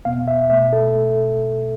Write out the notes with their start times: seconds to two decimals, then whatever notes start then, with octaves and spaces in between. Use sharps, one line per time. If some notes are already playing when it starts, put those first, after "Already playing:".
0.05 E2 B2 B3 F5
0.28 E5
0.50 B2 A3 E5
0.73 A4